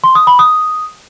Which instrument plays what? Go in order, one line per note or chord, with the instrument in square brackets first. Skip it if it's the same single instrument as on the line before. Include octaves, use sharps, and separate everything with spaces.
[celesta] C6
D#6
B5
D#6